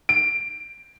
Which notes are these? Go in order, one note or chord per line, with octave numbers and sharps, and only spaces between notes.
D7